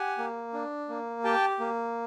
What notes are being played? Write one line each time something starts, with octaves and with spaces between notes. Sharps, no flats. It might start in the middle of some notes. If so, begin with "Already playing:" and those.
Already playing: G4 F#5 G#5
A#3
D4
A#3
G4 G5 A5
A#3